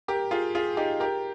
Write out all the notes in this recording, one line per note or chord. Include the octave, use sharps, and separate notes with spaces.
G4 A#4
F4 G#4
F4 G#4
D#4 G4
G4 A#4